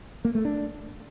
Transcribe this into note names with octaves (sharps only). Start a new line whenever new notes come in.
A#3
A3
D4